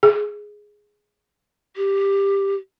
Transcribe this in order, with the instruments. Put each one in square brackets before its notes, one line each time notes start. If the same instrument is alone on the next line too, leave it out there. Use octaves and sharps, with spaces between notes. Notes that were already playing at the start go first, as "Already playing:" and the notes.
[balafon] G#4
[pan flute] G4